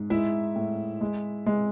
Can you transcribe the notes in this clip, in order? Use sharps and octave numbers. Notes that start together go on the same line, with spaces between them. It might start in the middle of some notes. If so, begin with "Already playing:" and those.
Already playing: G#2
G#3 E4 E5
A2
G#3
G#3